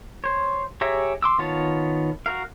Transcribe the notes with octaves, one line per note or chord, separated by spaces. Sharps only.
C5 C#5
G4 G#4 C#5 E5 A#5
C6 D6 E6
D#3 B3 F4 C#5 A5
F#4 A#4 F5